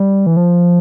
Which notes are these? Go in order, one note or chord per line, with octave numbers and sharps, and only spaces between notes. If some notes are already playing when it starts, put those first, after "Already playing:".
Already playing: G3
E3
F3